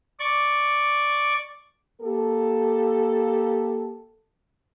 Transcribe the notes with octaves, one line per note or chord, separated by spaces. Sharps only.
D5 C#6
A#3 G4 A4